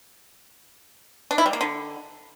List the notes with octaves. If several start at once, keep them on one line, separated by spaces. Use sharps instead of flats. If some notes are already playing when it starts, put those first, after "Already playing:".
D4
E4
G3
A#3
D3